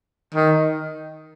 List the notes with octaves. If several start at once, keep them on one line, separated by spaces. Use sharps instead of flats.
D#3